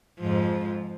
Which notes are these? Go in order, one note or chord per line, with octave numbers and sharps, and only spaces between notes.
F2 G#2 F3